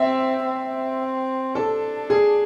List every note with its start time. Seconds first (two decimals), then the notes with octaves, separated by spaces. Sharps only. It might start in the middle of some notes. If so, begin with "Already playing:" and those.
Already playing: C4 E5
0.45 C4
1.55 D4 A4
2.10 G#4